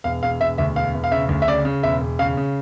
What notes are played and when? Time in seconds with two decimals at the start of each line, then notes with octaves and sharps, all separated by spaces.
0.04 E1 F5
0.23 E1 F5
0.41 E1 E5
0.58 D2 E5
0.76 E1 F5
0.94 E1
1.04 F5
1.11 C#3 E5
1.29 D2
1.42 E5
1.47 C#3 D5
1.65 C#3
1.83 E1 E5
2.01 E1
2.19 C#3 F5
2.37 C#3